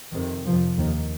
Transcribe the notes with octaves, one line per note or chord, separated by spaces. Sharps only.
F2 C3 D#3
F2 C3 F3
D#2 D#3